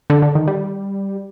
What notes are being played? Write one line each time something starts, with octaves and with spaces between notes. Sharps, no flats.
D3
D3
D#3
G3